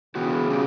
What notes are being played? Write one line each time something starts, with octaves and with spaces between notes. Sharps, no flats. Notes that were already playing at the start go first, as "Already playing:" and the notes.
C#3 E3 B3 F#4
B2 G3 C#4 G4